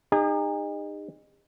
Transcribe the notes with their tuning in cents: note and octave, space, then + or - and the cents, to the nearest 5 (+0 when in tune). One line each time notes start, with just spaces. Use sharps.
D#4 -25 G#4 -45